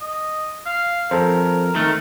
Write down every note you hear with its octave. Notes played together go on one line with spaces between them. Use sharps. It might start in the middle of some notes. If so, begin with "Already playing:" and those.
D#5
F5
F2 A4 A#4 C5
D#3 A3